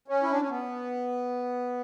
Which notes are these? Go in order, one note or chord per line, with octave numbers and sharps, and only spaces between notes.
C#4
E4
D4
C#4
B3